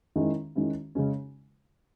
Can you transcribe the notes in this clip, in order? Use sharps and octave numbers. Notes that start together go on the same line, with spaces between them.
D#3 G#3 C#4 E4
D#3 G#3 C#4 E4
C#3 G#3 C#4